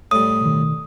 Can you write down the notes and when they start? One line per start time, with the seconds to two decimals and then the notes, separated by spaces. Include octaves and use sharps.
0.11 A2 G3 D#6
0.41 B2 D#3